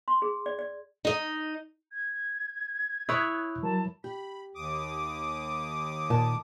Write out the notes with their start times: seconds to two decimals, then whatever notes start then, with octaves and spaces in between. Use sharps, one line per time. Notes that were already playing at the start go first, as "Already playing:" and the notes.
0.08 C6
0.22 G#4
0.46 D5
0.59 D5
1.05 D#4 D#5
1.92 G#6
3.09 E4 C#5 D#6 F#6 G6
3.63 F#3 A#4 A5
4.04 G4 B5
4.55 D#2 D6 D#6
6.10 A#2 A5